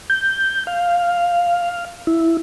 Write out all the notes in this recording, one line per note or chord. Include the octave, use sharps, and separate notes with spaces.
G6
F5
E4